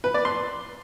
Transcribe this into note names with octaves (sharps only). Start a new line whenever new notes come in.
B4
D5
C6